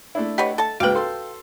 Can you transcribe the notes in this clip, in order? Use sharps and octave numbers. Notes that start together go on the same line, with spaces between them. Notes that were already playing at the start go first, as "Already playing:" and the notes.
A3 D4 E4
G4 B4 C#5 D#5 F#5
A4 A5
C#2 G#2 F#4 B4 F5 G5
A4 C6